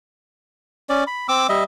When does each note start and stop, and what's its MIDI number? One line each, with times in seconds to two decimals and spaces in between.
0.89 1.04 61
0.89 1.04 74
1.07 1.27 83
1.28 1.47 60
1.28 1.47 86
1.28 1.47 88
1.49 1.64 55
1.49 1.64 75
1.49 1.64 76